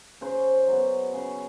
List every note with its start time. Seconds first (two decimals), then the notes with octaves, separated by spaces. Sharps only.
0.21 C#3 C5
0.67 F#3 B3
1.14 C#3